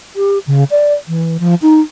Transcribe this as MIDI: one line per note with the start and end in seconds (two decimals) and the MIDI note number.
0.16 0.39 67
0.47 0.64 49
0.71 0.94 74
1.08 1.37 52
1.40 1.55 53
1.62 1.81 63